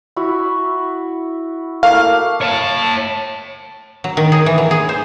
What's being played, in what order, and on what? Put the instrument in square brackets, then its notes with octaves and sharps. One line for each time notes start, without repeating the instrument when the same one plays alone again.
[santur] E4 F#4 B5
[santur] A3 A#3 E4 [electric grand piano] F5
[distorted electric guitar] C#5 A5
[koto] F#3
D#3
G#4
E3
F#3
G#4
C5